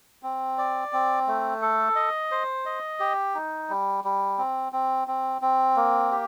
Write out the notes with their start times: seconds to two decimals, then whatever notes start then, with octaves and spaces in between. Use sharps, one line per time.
0.23 C4
0.58 D5
0.93 C4
1.27 A3
1.62 A4
1.96 D#5
2.31 C5
2.65 D#5
3.00 G4
3.35 D#4
3.69 G3
4.04 G3
4.38 C4
4.72 C4
5.08 C4
5.42 C4
5.76 A#3
6.11 G4